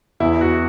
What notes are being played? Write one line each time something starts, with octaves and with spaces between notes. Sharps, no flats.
E2 E4
F#4